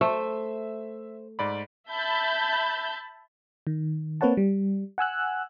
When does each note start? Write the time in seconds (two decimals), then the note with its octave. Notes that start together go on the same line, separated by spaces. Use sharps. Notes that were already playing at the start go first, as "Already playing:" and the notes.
0.01 A3 C5 E5
1.39 G#2 D5 B5
1.90 E5 A5 B5 G6
3.67 D#3
4.21 A#3 C4 B4 C#5 F#5 A5
4.37 G3
4.98 F#5 G#5 E6 F#6